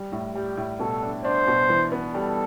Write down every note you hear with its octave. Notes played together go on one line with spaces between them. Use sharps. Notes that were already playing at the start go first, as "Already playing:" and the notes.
Already playing: G3
A2
G3 G4
A2
B2 A4
D4
D4 C5
B2
E3
B3
G3 A4